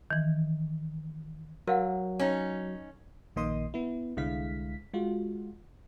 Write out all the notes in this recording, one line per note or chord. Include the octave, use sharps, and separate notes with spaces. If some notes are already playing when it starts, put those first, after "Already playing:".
D#3 E3
F#3 A#4 F5 F#5
C#4 D#4
A#1 D#3 A#3 D#5 C6 D#6
B3 E4
C2 D3 G#3 E4 F5 B6
G#3 F4 F#4